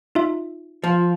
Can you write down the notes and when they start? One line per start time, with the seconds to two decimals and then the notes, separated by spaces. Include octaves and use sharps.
0.15 D#4 F4 E5
0.84 F3 F4